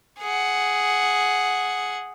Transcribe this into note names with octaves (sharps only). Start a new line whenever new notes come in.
G#4 F#5